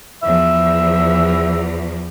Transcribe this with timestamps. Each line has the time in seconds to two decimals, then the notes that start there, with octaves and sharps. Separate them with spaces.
0.23 E2 F3 E5